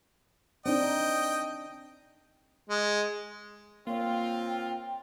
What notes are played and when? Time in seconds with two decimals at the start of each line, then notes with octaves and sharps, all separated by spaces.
0.66 C4 D4 D#4 D#5 G5
2.69 G#3
3.87 A#2 A#3 C4 F4 C#5 G5